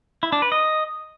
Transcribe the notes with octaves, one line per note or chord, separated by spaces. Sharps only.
E4
D4
B4
D#5